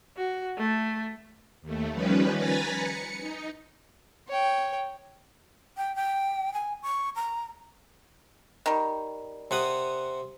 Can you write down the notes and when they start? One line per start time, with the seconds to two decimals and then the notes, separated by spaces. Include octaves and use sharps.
0.17 F#4
0.58 A3
1.62 D#2 A3
1.93 D#3 F3 G3 C#4 B4
2.35 B4 G#5 A#5 A6 B6
2.71 C#7
3.21 D#4
4.28 C#5 G5
5.77 G5
5.96 G5
6.54 G#5
6.83 C#6
7.16 A#5
8.66 D#3 G3
9.51 C3 F#5 D#6